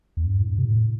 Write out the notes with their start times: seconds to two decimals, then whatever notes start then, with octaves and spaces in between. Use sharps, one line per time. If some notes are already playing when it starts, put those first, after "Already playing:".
0.17 E2
0.26 G2
0.41 A2
0.46 G2
0.58 C3
0.65 A2